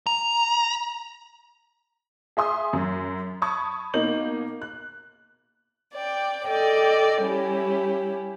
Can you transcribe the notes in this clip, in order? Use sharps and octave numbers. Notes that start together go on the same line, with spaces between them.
A#5
G#4 E5 C6 D#6
F#2
A5 B5 C#6 D#6 G#6
B2 A#3 D#4 G6 F#7
F#6
D5 G5
A4 D5 D#5 G5
G3 C#4 E4 G4